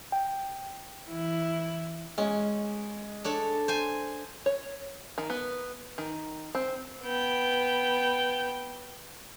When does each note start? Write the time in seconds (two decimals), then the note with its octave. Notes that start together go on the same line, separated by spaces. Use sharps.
0.12 G5
1.07 E3 E4
2.18 G#3 C#4
3.24 D4 A4 C#5
3.68 C5 G#5
4.46 C#5
5.18 D#3
5.30 B3
5.98 D#3
6.55 C4
7.04 B3 G5